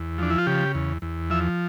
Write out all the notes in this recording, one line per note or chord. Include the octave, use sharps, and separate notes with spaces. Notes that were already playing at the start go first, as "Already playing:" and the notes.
Already playing: E2
F3 D4
E4
F4
C#3 G4
E2
E2
F3 E5